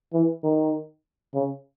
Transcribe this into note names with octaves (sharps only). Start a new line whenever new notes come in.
E3
D#3
C#3